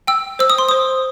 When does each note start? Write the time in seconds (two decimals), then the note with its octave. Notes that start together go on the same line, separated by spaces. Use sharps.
0.07 G5 E6
0.39 C5 E6
0.50 D#6
0.58 C6
0.69 C5 D#6